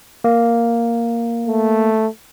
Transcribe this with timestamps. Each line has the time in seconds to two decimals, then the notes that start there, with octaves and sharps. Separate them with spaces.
0.24 A#3
1.48 A3